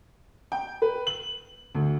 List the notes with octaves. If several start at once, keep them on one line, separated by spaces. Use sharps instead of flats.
G5
B4
F#7
D2